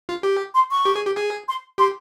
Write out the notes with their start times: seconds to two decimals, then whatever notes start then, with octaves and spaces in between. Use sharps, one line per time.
0.09 F4
0.23 G4
0.55 C6
0.70 C#6
0.85 G4
0.96 G#4
1.06 G4
1.17 G#4
1.47 C6
1.78 G4 C6